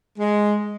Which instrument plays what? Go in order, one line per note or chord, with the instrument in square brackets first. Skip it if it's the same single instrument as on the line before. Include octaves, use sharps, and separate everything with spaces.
[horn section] G#3